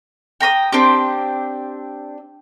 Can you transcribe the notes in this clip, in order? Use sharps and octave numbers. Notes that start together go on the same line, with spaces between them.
G5 A#5 B5 D#6
C4 D4 G4